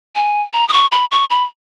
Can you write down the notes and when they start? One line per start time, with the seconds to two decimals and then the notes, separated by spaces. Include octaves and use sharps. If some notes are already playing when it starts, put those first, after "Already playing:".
0.15 G#5
0.53 A#5
0.68 D#6
0.73 C#6
0.92 B5
1.11 C#6
1.30 B5